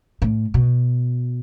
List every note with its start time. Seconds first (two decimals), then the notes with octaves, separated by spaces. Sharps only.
0.22 A2
0.54 B2